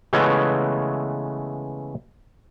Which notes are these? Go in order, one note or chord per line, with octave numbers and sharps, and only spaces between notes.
C#3 E3 G#3 A3 B3 C#4